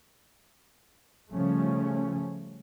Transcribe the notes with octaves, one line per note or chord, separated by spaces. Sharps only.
C#3 F3 G3 A3 C#4